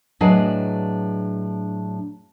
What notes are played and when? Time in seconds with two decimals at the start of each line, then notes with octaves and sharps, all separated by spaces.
0.20 A2 F#3 D4 G#4 B4 D#5